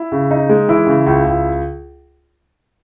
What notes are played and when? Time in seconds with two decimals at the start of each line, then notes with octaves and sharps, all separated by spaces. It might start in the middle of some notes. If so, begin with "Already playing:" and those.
Already playing: E4
0.12 C#3
0.31 D#4
0.49 G#3
0.68 E3 E4
0.87 C#3
1.06 C#2
1.25 C#2